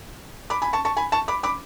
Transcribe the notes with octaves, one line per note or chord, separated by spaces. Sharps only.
B5 D6
G#5 B5
A5 C#6
A5 C#6
G#5 B5
A5 C#6
B5 D6
B5 D6